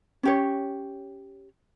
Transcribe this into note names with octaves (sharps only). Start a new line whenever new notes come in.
C#4 G4 C#5